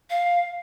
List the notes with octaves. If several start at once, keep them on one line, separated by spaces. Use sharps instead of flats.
F5